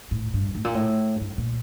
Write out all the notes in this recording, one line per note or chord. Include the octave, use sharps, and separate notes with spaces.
A2
G2
A2
A#2
A2
G2
A#2